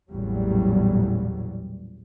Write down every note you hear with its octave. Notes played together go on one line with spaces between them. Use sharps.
A1 E2 A#2 F#3 G3